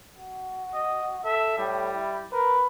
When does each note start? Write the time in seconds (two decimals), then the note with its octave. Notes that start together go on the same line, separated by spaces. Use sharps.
0.18 F#4
0.74 D#5
1.24 A4 E5
1.58 A2 G3
1.94 E4
2.32 A#4 B4